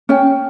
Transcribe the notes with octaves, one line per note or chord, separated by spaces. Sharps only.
C#4 G5